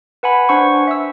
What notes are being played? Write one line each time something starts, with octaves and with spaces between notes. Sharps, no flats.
B4 F#5 G#5 B5
D4 C5 F#5 C#6
E5 E6